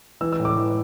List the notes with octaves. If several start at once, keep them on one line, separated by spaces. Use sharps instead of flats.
E3 E6
E6
A2
D6
E3